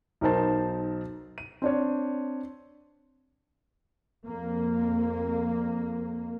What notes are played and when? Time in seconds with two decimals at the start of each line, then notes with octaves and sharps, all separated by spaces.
0.21 B1 D#4 A#4 C5 A5
1.38 D#7
1.62 C4 D4 C#5
4.25 F2 A#3